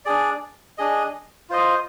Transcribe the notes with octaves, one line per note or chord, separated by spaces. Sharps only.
D4 G#4 D5
D4 G#4 D#5
F4 C5 D#5